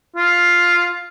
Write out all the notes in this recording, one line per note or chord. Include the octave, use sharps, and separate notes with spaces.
F4